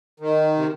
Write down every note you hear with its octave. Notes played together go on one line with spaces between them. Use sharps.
D#3
C3